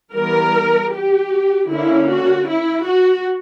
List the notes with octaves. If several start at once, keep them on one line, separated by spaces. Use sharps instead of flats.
E3 G3 B3 A#4
G4
D3 A#3 C#4 E4
F#4
E4
F#4